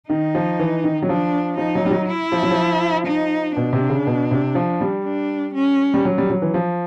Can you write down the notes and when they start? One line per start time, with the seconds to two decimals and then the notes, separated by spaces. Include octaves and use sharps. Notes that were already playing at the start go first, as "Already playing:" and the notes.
0.09 D#3 D#4
0.35 F3
0.60 E3
0.84 D#3
1.02 F#3
1.08 F3 D4
1.58 F3 D#4
1.75 F#3
1.85 G3
1.91 F#3
2.08 E4
2.32 F3
2.43 F#3
2.51 F3
3.07 D#4
3.56 B2 D4
3.73 C3
3.89 C#3
4.07 B2
4.31 C3
4.55 F3
4.81 G3
5.05 D4
5.54 C#4
5.94 G3
6.05 F#3
6.18 G3
6.30 F#3
6.42 E3
6.54 F3